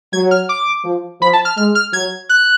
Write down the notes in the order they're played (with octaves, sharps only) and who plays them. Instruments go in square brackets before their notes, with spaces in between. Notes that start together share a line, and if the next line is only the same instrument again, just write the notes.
[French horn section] F#3 [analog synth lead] G#6
[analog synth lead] F6
D6
[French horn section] F3
[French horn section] F3 [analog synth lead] B5
[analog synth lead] A5
F6
[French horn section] G#3 [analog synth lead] F6
[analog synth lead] F6
[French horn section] F#3 [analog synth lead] G#6
[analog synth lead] F#6